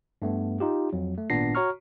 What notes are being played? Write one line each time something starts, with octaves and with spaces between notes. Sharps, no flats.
G2 A3 B3
D#4 F4 G4
F2 F#3
A3
G#1 A#2 B3 D4 A#6 C7
F#4 C#5 A#5 C#6 F6